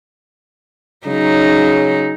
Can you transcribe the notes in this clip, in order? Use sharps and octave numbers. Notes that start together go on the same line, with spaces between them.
C#3 F#3 D#4